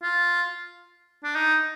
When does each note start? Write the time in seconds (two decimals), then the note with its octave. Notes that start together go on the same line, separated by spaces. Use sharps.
0.03 F4
1.24 D4
1.35 D#4